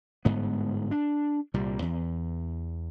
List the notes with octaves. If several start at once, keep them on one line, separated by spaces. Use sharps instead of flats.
G1 G#2 B3
D4
C2 A#2 G3
E2